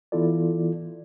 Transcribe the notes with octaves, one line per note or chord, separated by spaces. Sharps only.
E3 B3 E4 F4 A4 D5